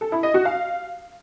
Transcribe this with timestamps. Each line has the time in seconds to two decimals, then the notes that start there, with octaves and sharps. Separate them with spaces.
0.01 A4
0.12 E4
0.23 D#5
0.34 F#4
0.45 F5